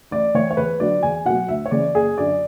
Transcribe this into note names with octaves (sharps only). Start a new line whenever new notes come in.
A1 D5
A2 E3 C#5
C#5
E2 B4
D3 F#3 D5
E2 G#5
B2 F#3 F#5
D2 E5
C#5
C#3 E3 D5
F#1 G#4
F#2 D3 D5